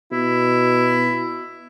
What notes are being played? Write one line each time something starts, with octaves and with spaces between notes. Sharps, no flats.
B2 E4